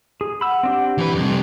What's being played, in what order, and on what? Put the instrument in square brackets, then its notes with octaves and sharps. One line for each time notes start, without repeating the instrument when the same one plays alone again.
[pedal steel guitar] G#4
[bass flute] F#5 [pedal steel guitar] B5 E6
[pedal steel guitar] C4 D4 G4
[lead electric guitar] E3 B4
[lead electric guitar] F2 C3 [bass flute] G3